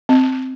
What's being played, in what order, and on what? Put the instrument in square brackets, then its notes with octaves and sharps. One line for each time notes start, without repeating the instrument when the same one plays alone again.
[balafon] C4